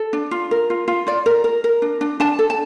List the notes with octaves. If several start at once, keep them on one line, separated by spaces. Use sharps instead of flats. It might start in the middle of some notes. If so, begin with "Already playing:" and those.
Already playing: A4
D4
F4
A#4
F4
F4
F4 D5
A#4
A#4
A#4
D4
D4
D4 A5
A4
A5